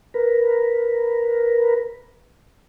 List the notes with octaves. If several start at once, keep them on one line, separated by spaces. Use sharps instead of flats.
A#4 B4